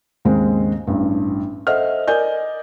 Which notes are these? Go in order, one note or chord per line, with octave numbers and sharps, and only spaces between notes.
D#2 G#2 C#3 G#3 C4
A1 G2
A4 C5 D#5 E5 F#5 F6
A#4 D5 D#5 G#5 G6